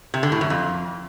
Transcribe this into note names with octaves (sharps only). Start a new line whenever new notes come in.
C3
D3
A2
F#2
F2